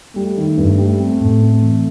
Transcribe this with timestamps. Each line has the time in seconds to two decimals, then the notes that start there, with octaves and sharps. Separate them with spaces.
0.16 G3 A3
0.37 D#3
0.58 G2
0.78 G3
1.00 C4
1.20 A2
1.41 C4
1.62 E3